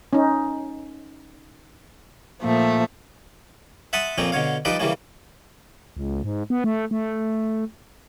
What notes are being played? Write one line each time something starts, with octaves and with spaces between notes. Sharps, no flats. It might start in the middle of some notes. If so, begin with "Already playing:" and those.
C#4 D#4
A#2 F3 A3
E5 F#5 A5 B5 C6 D#6
F2 A#2 F3 A#3 C4 C#4
B2 D3 C#5 F5
F3 G3 D#4 A4 B4 D5
C#3 E3 G3 A#3 C#4
C#2
G#2
B3
A3
A3